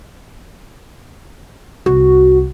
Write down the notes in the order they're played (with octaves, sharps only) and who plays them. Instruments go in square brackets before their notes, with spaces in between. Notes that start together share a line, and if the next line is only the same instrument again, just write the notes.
[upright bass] C2 [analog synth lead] F#4